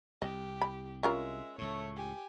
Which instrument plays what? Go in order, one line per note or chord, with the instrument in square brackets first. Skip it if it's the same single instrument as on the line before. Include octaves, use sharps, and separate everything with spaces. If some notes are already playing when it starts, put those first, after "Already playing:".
[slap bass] C2 [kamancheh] G4 [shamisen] D#5
[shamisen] B5
[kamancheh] G#3 E5 [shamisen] C#4 F4 A#4
[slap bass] C#2 A2 [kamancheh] A3 C#5
[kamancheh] G4 G#5